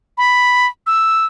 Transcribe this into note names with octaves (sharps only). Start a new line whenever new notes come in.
B5
E6